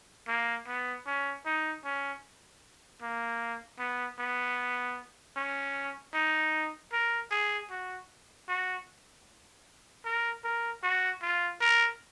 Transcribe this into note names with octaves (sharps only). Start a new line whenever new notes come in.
A#3
B3
C#4
D#4
C#4
A#3
B3
B3
C#4
D#4
A#4
G#4
F#4
F#4
A#4
A#4
F#4
F4
A#4